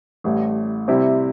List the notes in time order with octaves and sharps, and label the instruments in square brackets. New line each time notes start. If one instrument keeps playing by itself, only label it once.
[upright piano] A1 A2 G3
C3 G3 C4 E4